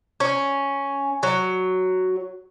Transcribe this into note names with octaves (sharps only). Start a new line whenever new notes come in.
C#4
F#3